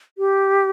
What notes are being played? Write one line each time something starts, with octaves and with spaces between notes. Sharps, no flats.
G4